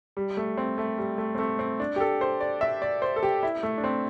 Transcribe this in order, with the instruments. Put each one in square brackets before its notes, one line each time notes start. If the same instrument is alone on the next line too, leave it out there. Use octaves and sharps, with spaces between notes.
[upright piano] G3
A3
C4
A3
G3
A3
C4
A3
C4
D4
G4
A4
C5
D5
E5
D5
C5
A4
G4
E4
A3
D4
C4